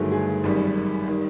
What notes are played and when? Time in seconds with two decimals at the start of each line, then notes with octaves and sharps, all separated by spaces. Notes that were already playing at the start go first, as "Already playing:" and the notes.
Already playing: G1 G2 D#3 F#3 A3 G#4
0.12 G#4
0.43 G#1 F#2 D#3 G3
1.08 D#3 G3